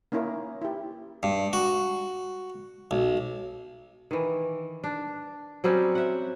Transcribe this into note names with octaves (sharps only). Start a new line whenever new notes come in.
A#3 C#4 D#4 E4 A#4
E4 G4
G2
F#4
B1
D#3 E3
D4
F#3 G3 C4 C#4
E5 F#5